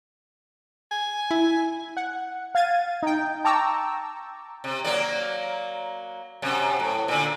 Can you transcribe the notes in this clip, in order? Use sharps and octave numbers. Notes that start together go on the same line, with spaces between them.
G#5
E4
F#5
F5 G#6 A6 D#7
D#4 G5
G5 A5 A#5 C#6 D6 E6
C3
F#3 A#3 D5
F#2 C3
A2
A#2 D3